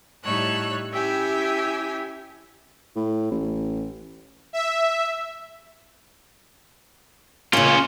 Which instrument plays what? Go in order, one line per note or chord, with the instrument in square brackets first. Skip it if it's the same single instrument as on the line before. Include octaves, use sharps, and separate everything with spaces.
[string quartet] A2 G3 D#4 C#5 E6 F#6
C#4 E4 G4 E5 G5 G#5
[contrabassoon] A2
A1
[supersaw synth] E5
[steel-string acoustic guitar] C#3 A#3 [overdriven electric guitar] C#4 F4